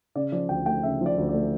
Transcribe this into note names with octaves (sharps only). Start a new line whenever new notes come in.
C#3 D5
F3 D5
D2 G5
A3 G5
C#3 E5
F3
D5
D2
D5
A3